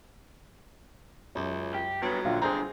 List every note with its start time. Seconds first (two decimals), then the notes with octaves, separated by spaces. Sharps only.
1.35 C#2 F#2
1.74 G4
2.02 F#3 G3 B3
2.25 A#1 D3 F4
2.42 G2 D3 C4 G#4 C5 A#5